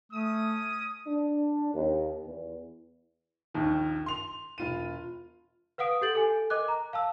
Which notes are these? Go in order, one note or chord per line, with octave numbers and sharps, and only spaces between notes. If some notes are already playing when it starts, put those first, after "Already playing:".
A3 C#4 D#6
D4
D#2
E2
A#1 D#2 D#3
C6 F7
E1 F4 D#7
B4 F5 F#5 D#6 D7
G4 A4 G6 A6 F#7
A4 G#5
A#4 D#5 D6 F#6
A#5
F5 A5 E6